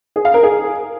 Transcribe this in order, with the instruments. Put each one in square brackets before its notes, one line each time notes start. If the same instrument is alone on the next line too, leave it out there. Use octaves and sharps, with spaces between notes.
[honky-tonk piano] G#4
F5
A#4
G#4